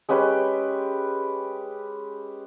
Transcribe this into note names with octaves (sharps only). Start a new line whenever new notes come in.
G#3 C#4 G4 B4